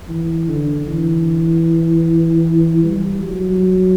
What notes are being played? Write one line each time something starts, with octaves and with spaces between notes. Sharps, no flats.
E3
D3
E3
G3
F#3